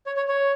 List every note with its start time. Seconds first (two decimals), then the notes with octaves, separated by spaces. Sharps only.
0.06 C#5
0.16 C#5
0.28 C#5